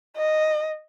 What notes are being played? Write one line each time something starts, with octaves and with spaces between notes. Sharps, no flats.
D#5